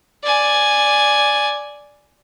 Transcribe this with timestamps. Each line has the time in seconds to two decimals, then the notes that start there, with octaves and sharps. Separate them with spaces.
0.24 D5 G#5